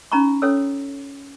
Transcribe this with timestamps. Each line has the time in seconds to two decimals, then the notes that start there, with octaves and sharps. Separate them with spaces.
0.12 C#4 D#4 A#5 B5 C#6
0.42 C#4 A4 C#5 E6